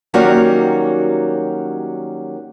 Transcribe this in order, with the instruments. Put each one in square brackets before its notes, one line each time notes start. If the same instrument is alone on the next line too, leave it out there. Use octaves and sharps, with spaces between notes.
[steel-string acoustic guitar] D#3 F#3 G3 A#3 C#4 F#4